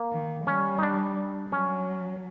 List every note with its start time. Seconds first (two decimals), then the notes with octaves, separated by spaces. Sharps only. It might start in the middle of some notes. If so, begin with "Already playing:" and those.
Already playing: A#3
0.12 D#3
0.47 G3 C#4
0.78 D#4
0.82 D4
1.52 F#3 C#4